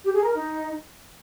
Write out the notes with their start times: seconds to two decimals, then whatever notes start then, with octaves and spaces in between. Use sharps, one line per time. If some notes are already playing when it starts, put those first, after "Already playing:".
0.04 G4
0.14 G#4
0.24 A#4
0.34 D#4